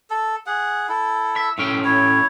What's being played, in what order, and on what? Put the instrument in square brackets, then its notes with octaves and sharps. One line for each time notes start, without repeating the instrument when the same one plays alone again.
[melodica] A4
G#4 F#5
E4 A4
[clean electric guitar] E5
[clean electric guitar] A2 C#4 G5 [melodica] E5
[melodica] E4 C#5